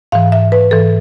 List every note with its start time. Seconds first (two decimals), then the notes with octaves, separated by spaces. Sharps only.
0.12 G#2 E3 F5
0.32 E5
0.52 B4
0.71 G#2 E3 A4